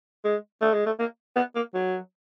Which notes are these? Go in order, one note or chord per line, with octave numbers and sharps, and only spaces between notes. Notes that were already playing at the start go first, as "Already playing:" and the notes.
G#3
A3
G#3
A3
A#3
B3
A#3
F#3